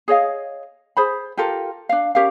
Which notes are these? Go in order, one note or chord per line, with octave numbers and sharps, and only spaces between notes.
G#4 C#5 D#5 F5
G#4 C5 B5
F4 G4 A4 A#4
D4 F5
C#4 G4 A#4 F5